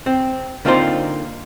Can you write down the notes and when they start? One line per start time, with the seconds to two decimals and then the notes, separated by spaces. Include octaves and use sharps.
0.06 C4
0.65 D3 A#3 C4 D#4 F4 C5